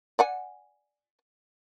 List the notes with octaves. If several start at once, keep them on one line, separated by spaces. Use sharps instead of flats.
D5 F#5 G#5